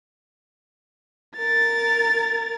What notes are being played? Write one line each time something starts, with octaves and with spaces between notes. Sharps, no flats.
A#4 A6